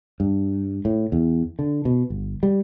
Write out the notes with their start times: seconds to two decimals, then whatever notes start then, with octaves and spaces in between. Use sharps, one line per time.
0.20 G2
0.85 A2
1.12 E2
1.59 D3
1.85 B2
2.10 G1
2.43 G3